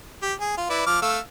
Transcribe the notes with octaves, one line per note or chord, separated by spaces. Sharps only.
G4
G#4
F4
E4 B4 D5
F3 D6 F6
A3 F5 E6